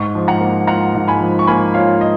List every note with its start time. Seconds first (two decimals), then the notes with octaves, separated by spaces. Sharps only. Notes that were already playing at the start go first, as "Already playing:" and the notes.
Already playing: G#2 C#6
0.15 F3
0.28 F#5 A#5
0.41 A#3
0.67 F4 F#5 A#5
0.94 G#2
1.08 G#5 B5
1.21 F3
1.39 C#6
1.47 A#3 G#5 B5
1.74 F4 C#5 F5
2.01 D#5